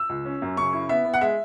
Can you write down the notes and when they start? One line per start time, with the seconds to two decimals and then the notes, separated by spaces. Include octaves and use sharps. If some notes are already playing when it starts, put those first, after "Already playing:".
Already playing: E6
0.09 C#2
0.25 C#4
0.42 F#2
0.57 C#3 C#6
0.73 E4
0.89 B3 E5
1.05 B3
1.14 F#5
1.21 G#3 E5